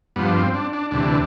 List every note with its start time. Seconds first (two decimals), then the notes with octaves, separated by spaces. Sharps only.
0.16 G2 F3 B3
0.28 D4
0.36 C4
0.54 D4
0.73 D4
0.91 D2 C3 E3 D4